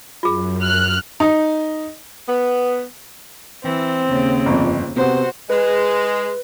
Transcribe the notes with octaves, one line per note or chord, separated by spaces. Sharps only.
F#2 F4 G#4
F6 F#6
D#4
B3
E3 C4
D#2 C#3
G1 F2
C3 B3 F#4 C5
G#3 B4